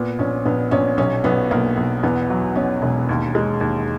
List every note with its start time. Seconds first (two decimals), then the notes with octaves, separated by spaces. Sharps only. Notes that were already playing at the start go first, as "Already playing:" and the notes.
Already playing: A#2 B3
0.19 A#1 C#4
0.45 A#1 B3
0.71 A#1 C#4
0.97 B1 C#4
1.24 B1 B3
1.51 B1 A#3
1.77 B1
2.03 E2 B3
2.30 F#3
2.55 B2 C#4
2.82 E1
3.09 D#2
3.35 G#3
3.61 D#2